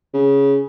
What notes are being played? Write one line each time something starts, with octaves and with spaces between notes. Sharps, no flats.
C#3